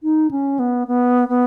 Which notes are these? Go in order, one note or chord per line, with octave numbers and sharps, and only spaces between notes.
D#4
C#4
B3
B3
B3